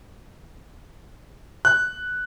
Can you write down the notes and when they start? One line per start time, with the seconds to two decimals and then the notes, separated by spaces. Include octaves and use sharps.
1.65 F#6